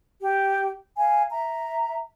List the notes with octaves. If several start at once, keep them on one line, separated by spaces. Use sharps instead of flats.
G4
F5 G#5
E5 A#5